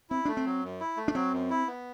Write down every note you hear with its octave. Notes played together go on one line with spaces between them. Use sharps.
C4 E4
A3 D4
C4
F#3
F#2
E4
A3
D4
F#3 C4
F#2
E4
B3